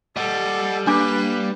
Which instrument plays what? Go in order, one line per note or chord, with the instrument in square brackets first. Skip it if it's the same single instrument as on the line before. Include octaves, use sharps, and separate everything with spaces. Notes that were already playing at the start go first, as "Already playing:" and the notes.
[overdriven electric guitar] G3 [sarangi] A4 [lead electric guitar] D#5 F#5
[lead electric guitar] A#3 [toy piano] D4 D6 [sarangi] B4